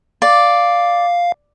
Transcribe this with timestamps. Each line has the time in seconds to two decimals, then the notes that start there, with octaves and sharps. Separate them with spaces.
0.22 D5 F5